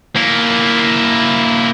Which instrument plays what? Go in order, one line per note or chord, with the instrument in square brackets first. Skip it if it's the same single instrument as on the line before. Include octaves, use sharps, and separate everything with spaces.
[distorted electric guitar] A#3 E4